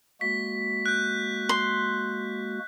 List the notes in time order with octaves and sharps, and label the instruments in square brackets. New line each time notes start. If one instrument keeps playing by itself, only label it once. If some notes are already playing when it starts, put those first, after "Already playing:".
[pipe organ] G#3 A#3 F#4 [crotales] B6
[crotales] F#6 G6
[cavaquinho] C6